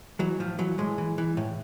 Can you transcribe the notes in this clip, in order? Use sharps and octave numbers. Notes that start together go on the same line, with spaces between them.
E3 F#3
A2 F3
E3 F#3
A2 G#3
E3
E3
A2